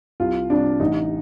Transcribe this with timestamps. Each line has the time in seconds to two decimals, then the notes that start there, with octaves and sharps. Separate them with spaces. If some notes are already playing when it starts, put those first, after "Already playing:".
0.20 C2 F4
0.50 C3 G3 D4
0.80 A1 D#4